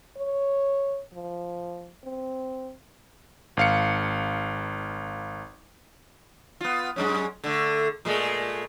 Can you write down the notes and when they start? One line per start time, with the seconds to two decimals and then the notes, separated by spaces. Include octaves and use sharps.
0.17 C#5
1.14 F3
2.04 C4
3.57 G#1 F5 C#7
6.61 B3 F4
6.96 F#2 G#3 C#4
7.44 D3 A3
8.05 A#2 G#3 A3